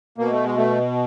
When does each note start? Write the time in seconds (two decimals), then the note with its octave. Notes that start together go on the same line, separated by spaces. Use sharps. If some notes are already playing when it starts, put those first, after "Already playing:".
0.18 B2 A#3
0.32 A3
0.44 G#3
0.57 A3